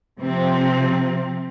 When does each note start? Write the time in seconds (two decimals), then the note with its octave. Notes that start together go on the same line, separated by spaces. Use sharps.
0.21 C3 F3 C4